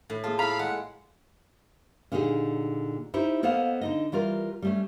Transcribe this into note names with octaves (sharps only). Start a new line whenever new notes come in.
A2
A#3 F4 G#4 A5
E4 F5 A#5 B5
G#3 F#5
A#2 D3 D#4 G4 G#4
D#4 E4 G4 C5
A#3 B3 A4 C5 D#5 F5
D3 D#4 D#5
E3 G3 F4 A#4
G3 A3 C#4